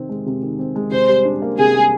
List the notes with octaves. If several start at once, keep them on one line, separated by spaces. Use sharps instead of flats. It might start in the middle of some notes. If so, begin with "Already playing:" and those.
Already playing: C3 D#3 C4
G#3
C3
D#3
C4
G#3
C3 C5
G3
D4
A#3
C3 G#4
G3